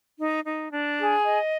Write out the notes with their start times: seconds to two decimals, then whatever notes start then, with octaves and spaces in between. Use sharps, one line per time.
0.19 D#4
0.46 D#4
0.71 D4
0.99 G#4
1.25 D#5